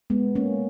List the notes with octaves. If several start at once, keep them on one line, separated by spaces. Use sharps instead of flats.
G#3 B3
A#3 C#4